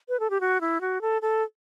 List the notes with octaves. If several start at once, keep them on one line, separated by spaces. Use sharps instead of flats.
B4
A4
G4
F#4
E4
F#4
A4
A4